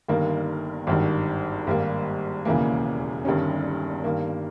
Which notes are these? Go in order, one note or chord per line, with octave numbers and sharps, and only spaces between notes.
G1 G2 D#3 A#3
G#1 G2 D#3
G#1 G2 G3 A#3
E1 D#2 C#3 E3 A#3
G1 G2 D#3 G3 C#4
G2 D#3 A#3